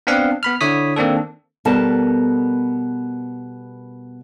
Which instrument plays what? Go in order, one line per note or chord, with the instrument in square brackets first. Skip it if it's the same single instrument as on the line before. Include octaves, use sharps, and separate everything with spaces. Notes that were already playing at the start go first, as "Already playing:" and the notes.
[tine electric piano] B3 C4 D4 F5 F#5
B3 B5 F6
D3 E4 C#5 D#6 B6
D#3 A#3 C4 D4 A4
[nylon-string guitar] B2 G3 B3 A4 A#4 A5